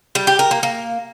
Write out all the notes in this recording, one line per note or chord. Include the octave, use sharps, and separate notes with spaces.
G3
G4
A#4
A#3
A#3